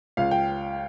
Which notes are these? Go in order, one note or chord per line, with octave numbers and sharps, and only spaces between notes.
C#2 F5
G5